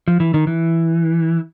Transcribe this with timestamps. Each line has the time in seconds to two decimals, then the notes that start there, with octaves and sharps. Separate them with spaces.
0.08 F3
0.20 E3
0.34 D#3
0.47 E3